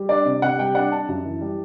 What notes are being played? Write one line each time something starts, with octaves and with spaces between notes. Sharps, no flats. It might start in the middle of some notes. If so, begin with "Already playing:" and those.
Already playing: G3
D4 D5
C3
C3 F#5
G3 G5
D4 F#5
D4 A5
F#2
E3
G3